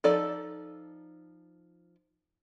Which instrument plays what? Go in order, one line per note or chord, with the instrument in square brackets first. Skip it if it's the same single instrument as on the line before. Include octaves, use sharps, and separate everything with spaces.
[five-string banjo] F3 D#4 A4 D5